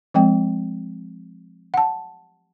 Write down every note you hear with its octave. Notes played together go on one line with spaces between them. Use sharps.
F3 G#3 C4 G5
F#5 A5